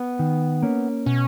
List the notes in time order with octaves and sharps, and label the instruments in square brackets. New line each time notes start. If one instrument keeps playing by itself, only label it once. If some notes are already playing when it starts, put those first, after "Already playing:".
Already playing: [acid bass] B3
[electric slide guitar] D#3
A#3 C#4
[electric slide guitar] B2 [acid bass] C#4